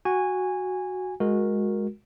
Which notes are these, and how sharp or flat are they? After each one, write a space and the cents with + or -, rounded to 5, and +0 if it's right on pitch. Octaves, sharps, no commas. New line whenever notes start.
F#4 +0 G#5 -15
G#3 +0 F#4 -15 A#4 +0